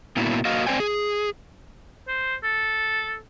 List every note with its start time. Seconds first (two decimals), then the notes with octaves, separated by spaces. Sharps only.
0.16 A#2 A#3 B3 E4 F#4
0.45 A#3 F#4 D#5 F5
0.67 C4 C#4 C5 D5 G5 G#5
0.80 G#4
2.07 C5
2.43 A4